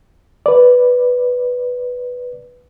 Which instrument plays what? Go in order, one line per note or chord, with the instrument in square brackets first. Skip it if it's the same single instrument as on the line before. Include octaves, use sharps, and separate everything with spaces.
[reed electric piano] B4 D5